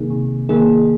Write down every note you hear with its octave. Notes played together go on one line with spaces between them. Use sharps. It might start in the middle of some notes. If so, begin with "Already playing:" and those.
Already playing: C3 D#3 A#3 D#4 G#4
C3
D#3 A#3 D#4 G#4